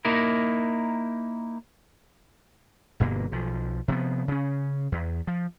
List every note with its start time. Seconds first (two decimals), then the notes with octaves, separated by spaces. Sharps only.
0.05 A#3 D#4 E4 A#4
3.00 G1 G2 B2 A#3
3.32 B1 F3
3.88 C3 F3 B3
4.28 C#3 C#4
4.92 E2
5.27 F3